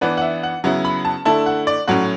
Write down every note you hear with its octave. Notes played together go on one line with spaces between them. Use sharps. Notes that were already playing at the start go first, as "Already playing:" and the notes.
E3 B3 D4 B4
F#5
E5
F#5
C#3 F#3 B3 E4
B5
A5
D3 A3 E4 A5
F#5
D5
A2 F#3 C#4 F#5